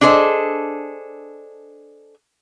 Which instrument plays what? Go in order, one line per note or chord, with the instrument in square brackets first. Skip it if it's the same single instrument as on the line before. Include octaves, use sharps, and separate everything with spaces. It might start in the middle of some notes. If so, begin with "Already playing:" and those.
[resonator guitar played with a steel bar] D4 G#4 A4 C5 D#5